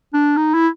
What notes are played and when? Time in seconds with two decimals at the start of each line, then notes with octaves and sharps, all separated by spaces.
0.14 D4
0.37 D#4
0.54 E4